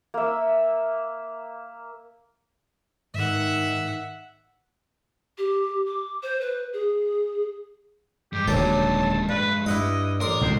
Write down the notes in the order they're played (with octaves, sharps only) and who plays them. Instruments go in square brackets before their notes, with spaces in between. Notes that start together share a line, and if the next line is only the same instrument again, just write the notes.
[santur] A#3 E5
[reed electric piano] G#2 [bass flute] D#3 [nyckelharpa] E5 F#5
[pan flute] G4
D6
C5
B4
G#4
[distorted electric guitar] G2 G#3 [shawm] G4
[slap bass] D#1 D3 [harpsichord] F#3 G4 [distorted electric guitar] G#3 A3 [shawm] A5
[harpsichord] G2 [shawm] B4
[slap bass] G2 [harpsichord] E4 F#5 D#6 [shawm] D#5
[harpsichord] A1 C6 D#6 [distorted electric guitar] A#4 [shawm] D5
[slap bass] C#2 G#2 B2 [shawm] C5